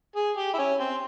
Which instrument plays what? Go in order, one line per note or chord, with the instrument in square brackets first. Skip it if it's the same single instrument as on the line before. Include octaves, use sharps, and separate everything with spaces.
[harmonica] G#4
G4
E4
C#4
C4